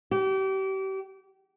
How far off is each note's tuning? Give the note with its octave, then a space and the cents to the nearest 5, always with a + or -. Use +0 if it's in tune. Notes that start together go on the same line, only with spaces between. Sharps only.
G4 -35